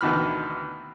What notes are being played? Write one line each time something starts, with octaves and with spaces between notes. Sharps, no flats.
D2 B2 D#3 E3 B5 F6